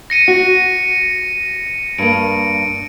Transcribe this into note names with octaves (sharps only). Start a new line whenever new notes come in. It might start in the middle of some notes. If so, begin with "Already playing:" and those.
A#6 C#7 D#7
F#4
G2 A#3 D7